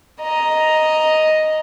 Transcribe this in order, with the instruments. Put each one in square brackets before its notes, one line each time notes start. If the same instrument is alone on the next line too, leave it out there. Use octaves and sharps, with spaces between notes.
[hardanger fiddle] D#5 A#5